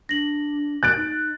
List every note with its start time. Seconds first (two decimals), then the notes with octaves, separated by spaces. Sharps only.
0.09 D4 A#6 F#7
0.83 F#6 A6 D7
0.96 D#4